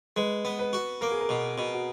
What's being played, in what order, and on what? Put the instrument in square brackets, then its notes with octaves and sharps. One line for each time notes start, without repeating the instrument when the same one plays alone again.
[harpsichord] G#3 [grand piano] B4
[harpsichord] B3
[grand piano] B4
[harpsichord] F#4
[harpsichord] A#3 [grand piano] A#4
[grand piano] G#4
A#4
[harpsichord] B2
B2
[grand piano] F#4